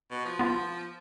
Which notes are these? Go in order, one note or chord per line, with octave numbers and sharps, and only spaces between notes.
B2
F3
B3 F4